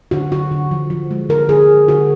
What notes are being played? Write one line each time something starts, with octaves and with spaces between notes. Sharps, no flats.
D3 F#4
D3 F#4
D3
F3
F3
G#3
D3 A#4
D3 G#4
D3
D3 F#4